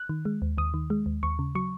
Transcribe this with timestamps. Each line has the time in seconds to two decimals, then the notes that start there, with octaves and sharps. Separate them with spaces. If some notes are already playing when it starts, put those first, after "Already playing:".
Already playing: F#6
0.09 D#3
0.25 G#3
0.42 D#2
0.58 D#2 D#6
0.74 D#3
0.90 G#3
1.06 D#2
1.23 D#2 C#6
1.39 C#3
1.55 F#3 C#6